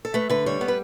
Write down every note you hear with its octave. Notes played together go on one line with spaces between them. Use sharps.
A4
A3 B4
D3 B4
G3 C#5
B3
B4